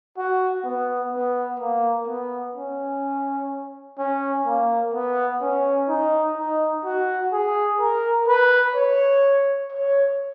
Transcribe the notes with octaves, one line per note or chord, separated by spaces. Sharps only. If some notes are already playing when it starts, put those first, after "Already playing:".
F#4
B3
B3
A#3
B3
C#4
C#4
A#3
B3
C#4
D#4
D#4
F#4
G#4
A#4
B4
C#5
C#5